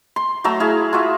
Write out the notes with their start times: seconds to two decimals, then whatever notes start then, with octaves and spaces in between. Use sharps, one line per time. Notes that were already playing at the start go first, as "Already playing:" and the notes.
0.16 C6
0.44 F#3 A3 A#5 E6
0.60 E4 G#4 F5
0.93 F4 F#4 E5